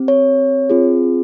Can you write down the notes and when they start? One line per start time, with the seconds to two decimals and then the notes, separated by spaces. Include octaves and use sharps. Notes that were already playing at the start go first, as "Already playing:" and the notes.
Already playing: C4 G4
0.08 C#5
0.70 C4 F4 G#4